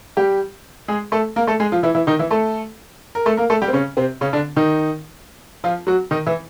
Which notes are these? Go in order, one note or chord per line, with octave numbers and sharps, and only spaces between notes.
G3 G4
G#3 G#4
A3 A4
A#3 A#4
A3 A4
G#3 G#4
F3 F4
E3 E4
E3 E4
D#3 D#4
E3 E4
A3 A4
A#4
A3 A4
A#3 A#4
A3 A4
G3 G4
C4
C#3 C#4
C3 C4
C#3 C#4
D3 D4
D#3 D#4
F3 F4
F#3 F#4
D#3 D#4
E3 E4